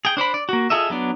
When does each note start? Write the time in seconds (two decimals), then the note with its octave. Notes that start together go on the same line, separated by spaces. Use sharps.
0.05 G#4 G5
0.17 D4 C5 D5 B5
0.34 D5
0.49 A#3 F#4
0.70 F4 G#4 A4 D#5 E5
0.90 F#3 B3 D4